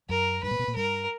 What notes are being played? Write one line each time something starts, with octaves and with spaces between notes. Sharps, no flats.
F#2 F#3 A#4
G2 G3 B4
A#2 A#3
B2 B3
A#2 A#3
G2 G3 A#4